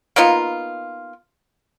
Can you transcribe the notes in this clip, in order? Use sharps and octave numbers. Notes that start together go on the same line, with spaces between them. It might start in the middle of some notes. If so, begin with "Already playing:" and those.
A#3 B3 D#4 F4